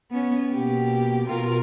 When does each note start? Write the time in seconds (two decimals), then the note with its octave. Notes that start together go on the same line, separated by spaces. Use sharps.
0.11 B3 C#4
0.51 B2 A#3 G4
1.26 B2 F4 A#4